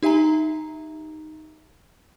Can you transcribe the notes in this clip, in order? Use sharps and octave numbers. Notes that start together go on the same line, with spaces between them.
D#4 G4 E5 G#5 A#5